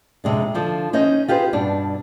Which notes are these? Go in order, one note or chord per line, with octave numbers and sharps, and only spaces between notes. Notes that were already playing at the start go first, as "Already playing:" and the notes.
F2 C3 G#3 D4
D3 F3
C#4 D#4 C5 D#5
F4 G4 G#4 B4 C5
G2 B2 D4